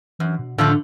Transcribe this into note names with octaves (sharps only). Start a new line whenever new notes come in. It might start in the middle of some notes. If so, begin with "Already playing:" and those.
F#2 E3
B2
A2 D3 F3 A3